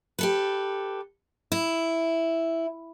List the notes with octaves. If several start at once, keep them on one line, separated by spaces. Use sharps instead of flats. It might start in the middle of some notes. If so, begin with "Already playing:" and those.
G4 A4 B4
E4